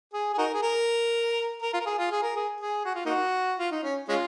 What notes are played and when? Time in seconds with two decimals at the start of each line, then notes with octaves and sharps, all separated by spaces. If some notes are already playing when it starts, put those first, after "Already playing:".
0.13 G#4
0.34 G#4
0.38 D#4 F#4 A#4
0.54 G#4
0.63 A#4
1.62 A#4
1.74 F4
1.81 A#4
1.86 G#4
1.98 F4
2.12 G#4
2.23 A#4
2.36 G#4
2.61 G#4
2.85 F#4
2.95 F4
3.06 A#3 D#4 F#4
3.59 F4
3.71 D#4
3.84 C#4
4.09 G#3 C#4 F4